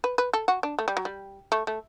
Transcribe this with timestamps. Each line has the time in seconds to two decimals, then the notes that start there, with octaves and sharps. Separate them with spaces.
0.04 B4
0.18 B4
0.33 A4
0.48 F#4
0.63 D4
0.79 A3
0.88 G3
0.97 F#3
1.05 G3
1.52 A3
1.67 A3